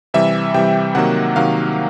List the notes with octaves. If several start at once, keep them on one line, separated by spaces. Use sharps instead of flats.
C3 E3 G3 E5
C3 E3 G3 G5
C3 D#3 F#3 A#3 F#5
C3 D#3 F#3 A#3 F5